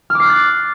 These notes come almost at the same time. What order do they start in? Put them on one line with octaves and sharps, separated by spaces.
F6 D6 C7 F#6 A6